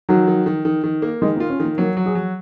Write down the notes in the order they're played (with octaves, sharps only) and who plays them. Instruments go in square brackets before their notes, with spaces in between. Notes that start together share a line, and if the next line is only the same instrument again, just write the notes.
[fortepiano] D#3 [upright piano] F#3
[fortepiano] D#3
D#3
D#3
D#3
A#3
[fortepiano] D#3 [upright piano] G#3
[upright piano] A#3
[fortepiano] F4
[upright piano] C#4
[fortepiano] D#3 [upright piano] A#3
[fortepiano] F#3 [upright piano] A#3
[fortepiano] F#3
[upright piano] G#4
[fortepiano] F#3